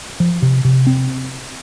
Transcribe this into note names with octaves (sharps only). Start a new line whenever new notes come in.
F3
C3
C3
C4